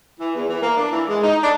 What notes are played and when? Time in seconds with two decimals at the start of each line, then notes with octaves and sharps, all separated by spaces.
0.19 E3
0.35 E2
0.49 E3
0.61 A#3
0.77 D4
0.91 E3
1.07 G#3
1.23 D#4
1.42 D4